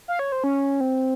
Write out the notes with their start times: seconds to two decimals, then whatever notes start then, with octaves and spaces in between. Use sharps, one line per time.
0.08 F5
0.19 C#5
0.32 C5
0.44 C#4
0.81 C4